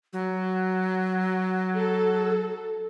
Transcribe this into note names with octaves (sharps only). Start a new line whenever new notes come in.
F#3
A4